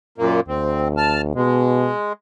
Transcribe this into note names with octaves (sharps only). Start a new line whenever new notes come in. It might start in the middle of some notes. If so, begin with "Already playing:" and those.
F#2 A#2 A#3
D2 C4
A5 F6
B2 G#3